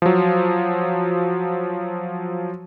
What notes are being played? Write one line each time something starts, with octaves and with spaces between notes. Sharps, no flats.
F3 F#3